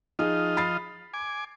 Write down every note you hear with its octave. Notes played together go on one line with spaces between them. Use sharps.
F3 D#4 F4 G#4 D#5
B5 A6 C7
G#5 D6